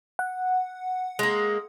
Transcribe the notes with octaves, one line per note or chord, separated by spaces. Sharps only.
F#5
G#3 A#3